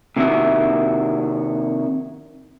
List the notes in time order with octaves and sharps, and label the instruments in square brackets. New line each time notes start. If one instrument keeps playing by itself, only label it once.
[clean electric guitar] C3 D#3 E4 F#4 E5